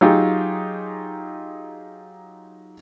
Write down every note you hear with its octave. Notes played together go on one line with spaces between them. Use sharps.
F#3 D#4 F4 G4 G#4